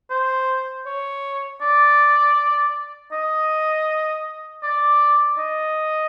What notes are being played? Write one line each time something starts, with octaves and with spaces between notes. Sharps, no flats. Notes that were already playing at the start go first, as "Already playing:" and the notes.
C5
C#5
D5
D#5
D5
D#5